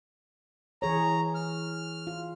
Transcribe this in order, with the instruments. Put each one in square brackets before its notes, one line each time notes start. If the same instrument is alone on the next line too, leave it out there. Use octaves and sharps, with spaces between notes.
[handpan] E3 G#4 C#5 [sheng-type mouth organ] A#5
[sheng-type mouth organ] F6
[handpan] F4